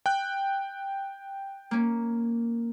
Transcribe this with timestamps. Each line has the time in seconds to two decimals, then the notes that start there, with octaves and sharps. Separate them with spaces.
0.06 G5 F#6
1.71 A#3 C#4